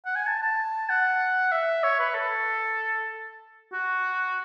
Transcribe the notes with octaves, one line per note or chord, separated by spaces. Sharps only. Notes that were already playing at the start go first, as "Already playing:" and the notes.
F#5
G#5
A5
A5
F#5
E5
C#5
B4
A4
F#4